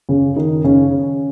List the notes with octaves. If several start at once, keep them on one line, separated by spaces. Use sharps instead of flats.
C#3 C#4
D#3 D#4
C#3 C#4